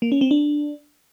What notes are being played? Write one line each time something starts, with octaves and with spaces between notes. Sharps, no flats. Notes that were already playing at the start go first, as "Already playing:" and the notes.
A#3
C#4
C4
D4